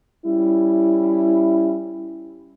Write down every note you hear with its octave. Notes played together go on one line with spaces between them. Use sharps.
G3 C#4 E4